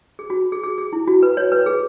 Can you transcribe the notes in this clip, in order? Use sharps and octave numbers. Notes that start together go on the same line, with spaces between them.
G#4
F#4
G#4
G#4
G#4
E4
F#4
B4
C#5
B4
G#4